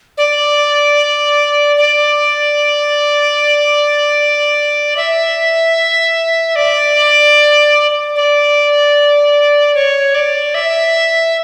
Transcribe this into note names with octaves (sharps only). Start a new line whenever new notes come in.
D5
D5
E5
D5
D5
C#5
D5
E5